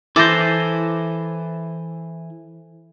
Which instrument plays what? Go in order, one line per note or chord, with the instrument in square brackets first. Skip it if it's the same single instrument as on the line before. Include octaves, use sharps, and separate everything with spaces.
[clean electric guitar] E3 [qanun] E4 [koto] A4 C5 [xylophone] D6 A6 A#6